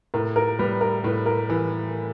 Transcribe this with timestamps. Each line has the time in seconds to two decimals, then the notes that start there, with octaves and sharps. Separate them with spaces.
0.14 A2 A#4
0.36 A#4
0.59 G3 B4
0.81 A#4
1.04 A2 B4
1.26 A#4
1.49 E3 B4